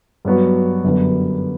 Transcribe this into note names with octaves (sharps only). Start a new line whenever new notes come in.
G2 F#3 B3 F#4
F#2 D3 G3 B3